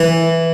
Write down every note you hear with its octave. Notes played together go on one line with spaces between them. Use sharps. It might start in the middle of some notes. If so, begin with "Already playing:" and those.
Already playing: E3